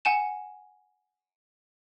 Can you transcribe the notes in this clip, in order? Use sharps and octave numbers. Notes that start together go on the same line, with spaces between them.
F#5 G#5 E7